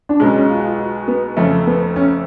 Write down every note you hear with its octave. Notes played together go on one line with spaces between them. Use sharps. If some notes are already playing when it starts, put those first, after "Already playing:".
D4
B1 B2 G#3 C#4
C#4
F4
F#4
F4
F#4
B3
F#1 F2 F3 A3 C#4
B3
C#4